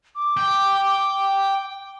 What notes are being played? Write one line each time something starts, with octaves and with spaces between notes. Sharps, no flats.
D6
G5